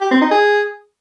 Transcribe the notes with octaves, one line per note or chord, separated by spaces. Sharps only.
G4
C4
D#4
G#4